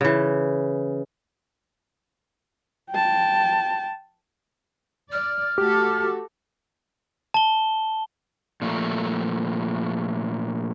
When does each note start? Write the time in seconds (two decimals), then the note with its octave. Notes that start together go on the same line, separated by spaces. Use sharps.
0.01 C#3 E3
2.91 G5 A5
5.12 D5 F6
5.58 A3 F#4 G4 A4
7.34 A5 G7
8.62 A#2 F3 A3